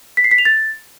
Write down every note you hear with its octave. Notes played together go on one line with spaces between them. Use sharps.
B6
C7
B6
F7
A6